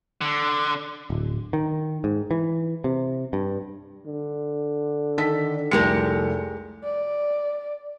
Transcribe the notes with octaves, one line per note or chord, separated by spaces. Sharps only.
D3
D1
D#3
G#2
E3
C3
G2
D3
D#3 A4 B6
F1 C2 G#3 G4 A#4 C#7
D5